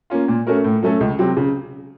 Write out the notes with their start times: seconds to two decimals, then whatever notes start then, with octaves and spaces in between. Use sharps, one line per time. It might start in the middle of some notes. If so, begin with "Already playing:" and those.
0.10 A#3 C#4 F4
0.28 A#2
0.47 A3 C#4 F#4 A#4
0.64 A2
0.83 F#3 A3 C#4 A4
1.01 C#2
1.19 C3 F#3 C4
1.37 C#3